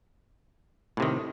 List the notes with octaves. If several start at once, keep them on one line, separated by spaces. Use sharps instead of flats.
A2 C3 D#3